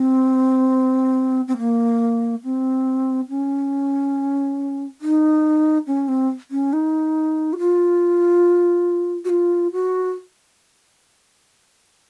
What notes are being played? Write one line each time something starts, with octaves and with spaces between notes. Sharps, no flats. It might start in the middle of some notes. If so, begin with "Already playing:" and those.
Already playing: C4
C4
A#3
C4
C#4
D#4
C#4
C4
C#4
D#4
F#4
F4
F#4
F4
F#4